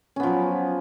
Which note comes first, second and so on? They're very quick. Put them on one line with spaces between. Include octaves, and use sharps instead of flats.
C#4 B3 F3 F#3